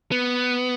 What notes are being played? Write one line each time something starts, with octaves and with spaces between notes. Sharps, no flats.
B3